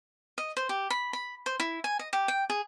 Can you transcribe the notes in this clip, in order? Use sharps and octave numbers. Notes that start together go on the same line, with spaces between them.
D#5
C5
G4
B5
B5
C5
E4
G#5
D#5
G4
G5
G#4